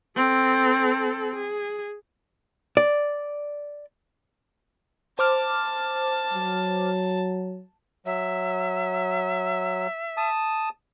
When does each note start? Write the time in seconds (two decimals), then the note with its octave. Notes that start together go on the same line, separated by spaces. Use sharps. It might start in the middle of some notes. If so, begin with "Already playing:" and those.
0.16 C4 A4
1.36 G#4
2.77 D5
5.19 C5 A5 D6 F6
6.33 F#3
8.06 F#3 E5
10.17 A5 D#6